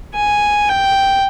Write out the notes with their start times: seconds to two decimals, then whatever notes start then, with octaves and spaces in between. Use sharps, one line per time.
0.15 G#5
0.69 G5